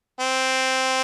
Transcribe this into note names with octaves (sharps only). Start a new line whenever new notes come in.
C4